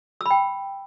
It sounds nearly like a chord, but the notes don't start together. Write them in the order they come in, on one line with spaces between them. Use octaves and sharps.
E6 B5 G5